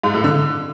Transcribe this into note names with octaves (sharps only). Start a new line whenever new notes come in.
G#2
A2
D3